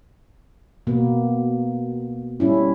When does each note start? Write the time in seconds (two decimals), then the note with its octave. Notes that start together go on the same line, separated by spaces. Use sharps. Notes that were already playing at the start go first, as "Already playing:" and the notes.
0.87 B2 A#3 B3
2.40 G3 C#4 E4